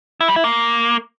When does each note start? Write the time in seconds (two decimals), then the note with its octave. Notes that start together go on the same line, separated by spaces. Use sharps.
0.21 E4
0.28 G3
0.36 E4
0.44 A#3